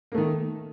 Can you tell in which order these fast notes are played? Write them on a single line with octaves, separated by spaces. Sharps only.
A#3 A3 D#3